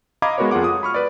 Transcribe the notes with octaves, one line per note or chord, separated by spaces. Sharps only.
D#5 F5 A#5 B5 D6 G#6
G#3 B3 F#4 A#4 B4 C#5
F2 F4 G#4 F#5 D6
D#6
B5 C#6 F6
B4 D5